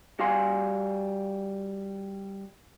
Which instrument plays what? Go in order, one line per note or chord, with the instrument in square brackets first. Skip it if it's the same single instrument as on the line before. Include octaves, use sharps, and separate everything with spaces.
[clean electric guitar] G3 F#4 F5 G#5 C6